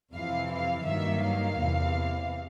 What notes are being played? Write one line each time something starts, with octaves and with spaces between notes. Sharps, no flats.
F2 C3 E3 F5
F5
G2 D#3 F#3 A#3 E5
F5
E2 C3 E3